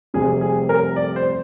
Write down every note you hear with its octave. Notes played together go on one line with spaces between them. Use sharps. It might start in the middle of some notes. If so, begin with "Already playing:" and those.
F1 F2 C3 G3 G#4
G#4
A#4
D5
C5